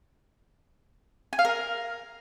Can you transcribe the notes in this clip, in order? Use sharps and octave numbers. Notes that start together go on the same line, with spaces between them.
G#5
F5
A#4